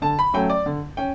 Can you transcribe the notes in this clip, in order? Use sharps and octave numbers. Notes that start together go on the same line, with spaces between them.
D3 A5
B5
F#3 A3 C#4 G5
D5
D3
C#4 G5